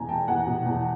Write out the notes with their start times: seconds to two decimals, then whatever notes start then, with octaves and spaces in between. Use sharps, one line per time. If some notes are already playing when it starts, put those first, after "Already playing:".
Already playing: E2 B2 G#5 A#5
0.08 G#3 G5 A5
0.28 E2 F#5 G#5
0.47 B2
0.66 E2